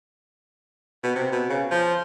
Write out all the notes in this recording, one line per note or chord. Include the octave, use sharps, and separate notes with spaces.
B2
C3
B2
C#3
F3